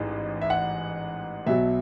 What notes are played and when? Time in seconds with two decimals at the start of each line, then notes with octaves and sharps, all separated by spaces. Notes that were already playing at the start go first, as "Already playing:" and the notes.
Already playing: A1 G#2 E3 G#3
0.42 E5
0.50 F#5
1.46 B1 B2 F#3 E5